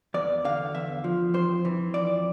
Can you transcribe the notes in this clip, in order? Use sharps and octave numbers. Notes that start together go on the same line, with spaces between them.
E2 D5
D3 F5
E2 E5
F3
F2 C5
E3
F2 D5